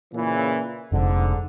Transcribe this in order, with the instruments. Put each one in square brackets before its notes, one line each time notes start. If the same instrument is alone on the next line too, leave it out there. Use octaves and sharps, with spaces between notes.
[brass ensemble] A#2 C#3 E3
[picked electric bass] F1 [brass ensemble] G#2 D3